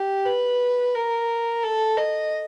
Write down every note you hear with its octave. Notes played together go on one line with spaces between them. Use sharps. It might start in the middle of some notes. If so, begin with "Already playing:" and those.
Already playing: G4
B4
A#4
A4
D#5